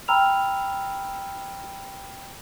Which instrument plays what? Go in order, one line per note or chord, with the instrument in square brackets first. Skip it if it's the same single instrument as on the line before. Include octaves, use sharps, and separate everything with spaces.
[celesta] G5 A#5 B5 E6 F6 F7